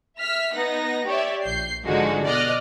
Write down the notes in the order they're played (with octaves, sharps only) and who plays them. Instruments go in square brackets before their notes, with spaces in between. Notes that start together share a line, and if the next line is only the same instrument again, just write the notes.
[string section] E5 F6 B6
B3 D#4 F#5 A#6
G4 C#5 D5 E5
A#1 G6 C7
G#2 D3 F3 G#3 D#4 F#4
B2 D5 D#5 F6 F#6